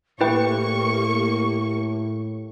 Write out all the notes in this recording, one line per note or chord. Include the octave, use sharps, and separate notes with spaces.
A2 A#3 E4 G4 B4 G5 C#6